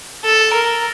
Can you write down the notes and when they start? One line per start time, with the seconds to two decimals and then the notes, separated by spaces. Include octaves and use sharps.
0.24 A4
0.54 A#4